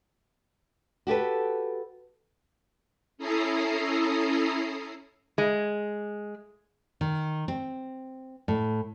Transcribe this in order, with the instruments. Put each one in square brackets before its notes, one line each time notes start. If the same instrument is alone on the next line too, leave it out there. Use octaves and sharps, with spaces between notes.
[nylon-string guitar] F#4 G4 A4 B4
[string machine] C#4 E4 A4 A#5 D#6 C7
[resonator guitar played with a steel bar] G#3
[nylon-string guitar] D#3
C4
A2